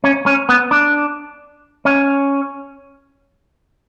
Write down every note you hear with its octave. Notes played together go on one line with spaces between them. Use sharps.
C#4
C#4
B3
D4
C#4